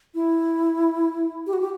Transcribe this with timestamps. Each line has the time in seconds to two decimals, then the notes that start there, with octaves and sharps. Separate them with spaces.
0.14 E4
1.47 G4
1.53 F#4
1.60 G4